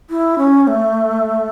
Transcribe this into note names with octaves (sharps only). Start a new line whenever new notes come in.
E4
C#4
A3